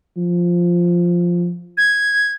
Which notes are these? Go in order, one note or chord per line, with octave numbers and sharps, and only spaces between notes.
F3
G#6